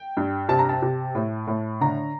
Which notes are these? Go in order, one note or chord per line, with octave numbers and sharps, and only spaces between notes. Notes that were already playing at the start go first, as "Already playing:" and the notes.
Already playing: G5
G2
C3 A5
A#5
A5
C3
A2
A2
D3 A#5